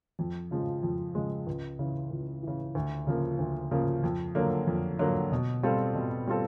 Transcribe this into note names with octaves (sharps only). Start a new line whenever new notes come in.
F2
C#3 F3 G#3
F2
C#3 F3 G#3
C#2
C#3 E3
C#2
C#3 E3
D2
C#3 F3 A#3
D2
C#3 F3 A#3
F2
D3 F#3 A#3
F2
D3 F#3 A#3
B2
G3 C4 F4 A4
B2
G3 C4 F4 A4